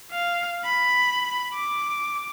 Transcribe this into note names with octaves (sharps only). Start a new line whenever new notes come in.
F5
B5
D6